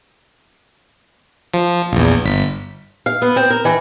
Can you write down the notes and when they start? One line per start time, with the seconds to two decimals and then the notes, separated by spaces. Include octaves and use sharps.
1.54 F3
1.92 A#1 E2
2.25 G1 B6
3.06 F5
3.22 B3
3.36 C4
3.50 A#4
3.65 E3